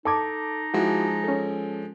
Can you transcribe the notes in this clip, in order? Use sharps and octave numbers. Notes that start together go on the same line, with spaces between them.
D#4 A4 A5 D6 G#6
F3 G#3 E4 F#4
C#4 A4